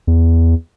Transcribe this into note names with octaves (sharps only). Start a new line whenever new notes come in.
E2